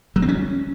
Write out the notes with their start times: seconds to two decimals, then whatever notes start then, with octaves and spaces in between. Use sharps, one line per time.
0.16 F#3
0.22 C4
0.29 C#4